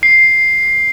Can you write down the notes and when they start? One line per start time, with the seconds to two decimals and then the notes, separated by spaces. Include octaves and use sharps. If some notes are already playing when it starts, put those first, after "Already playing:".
0.03 C7